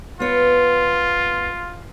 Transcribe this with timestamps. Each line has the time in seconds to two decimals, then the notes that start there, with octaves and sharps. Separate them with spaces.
0.20 B3 F4 C#5